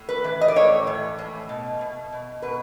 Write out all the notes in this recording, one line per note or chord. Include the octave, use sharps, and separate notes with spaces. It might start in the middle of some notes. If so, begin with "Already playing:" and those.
Already playing: A2
B4
E3
D#5
D5
A2 C#5
E3
A2
B2
B2
B2
B2 B4